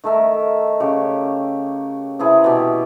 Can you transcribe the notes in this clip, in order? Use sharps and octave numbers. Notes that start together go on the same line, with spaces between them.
D#3 A3 A#4 E5
C#3 G4 C#5
C3 E3 E4 G#4
B2 G4